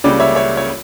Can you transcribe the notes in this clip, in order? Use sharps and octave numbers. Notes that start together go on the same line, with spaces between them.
C#2 C#3 G3 A#3 C#4 D5
C#5 E5
C#5 E5
C#5